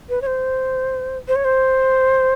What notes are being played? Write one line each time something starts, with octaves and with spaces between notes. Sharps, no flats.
B4
C#5
C5
C5
C#5
C5